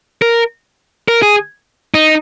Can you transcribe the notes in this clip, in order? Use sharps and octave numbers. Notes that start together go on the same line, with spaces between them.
A#4
A#4
G#4
D#4